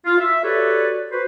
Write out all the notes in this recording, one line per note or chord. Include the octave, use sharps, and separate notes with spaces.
F4
E5
F#4 G4 A4 B4 C#5 D5
F#4 B4 C5